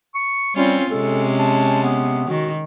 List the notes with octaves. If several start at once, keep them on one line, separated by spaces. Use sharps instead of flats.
C#6
G3 C4 C#4 F4
C3 G#3 C#4 A4
A5
B3
D#3 F#4